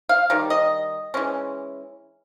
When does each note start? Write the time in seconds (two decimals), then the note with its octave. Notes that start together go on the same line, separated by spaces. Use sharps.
0.09 F5
0.30 D#3 G3
0.50 D#5
1.14 E3 G#3 C#4